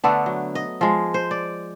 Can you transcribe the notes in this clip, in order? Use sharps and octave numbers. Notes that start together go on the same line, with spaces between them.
D3 A3 B3 D4
F#3
D#5
F3 G#3
C5
D5